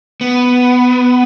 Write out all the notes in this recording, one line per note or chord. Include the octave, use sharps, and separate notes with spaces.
B3